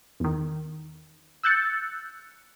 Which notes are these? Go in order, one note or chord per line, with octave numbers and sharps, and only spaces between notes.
E2 D#3
E6 F#6 G6 A6 C#7